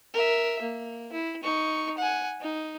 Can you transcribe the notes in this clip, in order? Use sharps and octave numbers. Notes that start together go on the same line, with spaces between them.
A#4 E5
A#3
E4
D#4 C#6
F#5 G#5
D#4